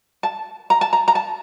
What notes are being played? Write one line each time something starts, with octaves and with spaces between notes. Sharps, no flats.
A5
A#5
A5
A#5
A#5
A5